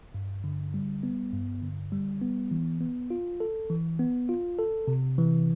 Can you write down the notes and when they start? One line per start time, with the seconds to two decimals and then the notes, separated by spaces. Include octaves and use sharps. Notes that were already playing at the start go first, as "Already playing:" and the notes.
0.14 G2
0.44 D3
0.74 G3
1.03 B3
1.33 G2
1.63 D3
1.92 G3
2.22 B3
2.51 E3
2.81 B3
3.10 F4
3.40 A4
3.70 E3
4.00 B3
4.29 F4
4.59 A4
4.88 C3
5.18 E3